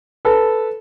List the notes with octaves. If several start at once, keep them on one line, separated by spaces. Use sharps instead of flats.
A4 B4